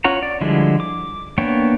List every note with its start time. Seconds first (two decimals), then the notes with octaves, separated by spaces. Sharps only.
0.04 C#4 F4 C#5 F#5 A#5
0.23 D5
0.41 D3 F3 G3 G#3 E4
0.80 D6
1.38 A#3 B3 D4 C#5 G5